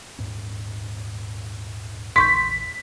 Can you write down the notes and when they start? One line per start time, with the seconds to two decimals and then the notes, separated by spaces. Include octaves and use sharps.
0.19 D#1 G#2 C#4
2.16 A#1 E2 C6 C#6 G6 B6